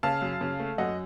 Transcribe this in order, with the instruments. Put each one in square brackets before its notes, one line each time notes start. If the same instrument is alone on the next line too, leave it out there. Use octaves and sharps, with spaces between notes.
[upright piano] C#3 F5 A5
F#2
C#3
A3
F#2 D#5 F#5